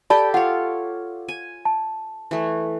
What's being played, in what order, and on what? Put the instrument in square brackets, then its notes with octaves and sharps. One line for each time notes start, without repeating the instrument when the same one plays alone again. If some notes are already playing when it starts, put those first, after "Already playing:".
[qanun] G4 A4 G5 [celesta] D5 A5 B5
[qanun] F4 C#5 [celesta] F#5
[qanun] G#5
[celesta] A5
[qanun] E3 A3